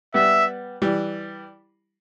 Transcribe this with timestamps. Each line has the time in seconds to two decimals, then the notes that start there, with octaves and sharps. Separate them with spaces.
0.14 G3 B3 E5
0.82 E3 G3